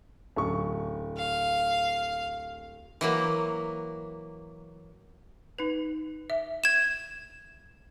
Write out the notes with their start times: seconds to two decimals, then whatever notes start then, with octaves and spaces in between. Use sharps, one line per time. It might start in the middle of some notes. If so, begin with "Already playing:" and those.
0.36 D1 C#6
1.18 F5
3.01 E3 F#3 A#3
5.59 D#4 B4
6.30 E5
6.64 G#6 E7